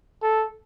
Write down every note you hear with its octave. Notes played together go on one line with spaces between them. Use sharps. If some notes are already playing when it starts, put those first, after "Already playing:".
A4